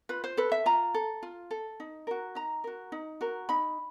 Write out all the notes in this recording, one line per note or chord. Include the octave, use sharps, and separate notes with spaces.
F4 B4
C5
A4 B4
E5
F4 A#5
A4
F4
A4
D#4
F#4 A#4
D#4 A#5
F#4 A#4
D#4
F#4 A#4
D#4 B5